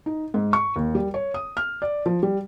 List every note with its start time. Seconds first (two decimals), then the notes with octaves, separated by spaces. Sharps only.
0.06 D#4
0.34 G#2
0.53 C#6
0.76 D#2
0.95 G3
1.14 C#5
1.34 D#6
1.57 F6
1.82 D5
2.06 F3
2.23 G3